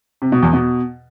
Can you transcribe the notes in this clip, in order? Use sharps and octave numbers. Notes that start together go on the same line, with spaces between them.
C3
B2
E2
B2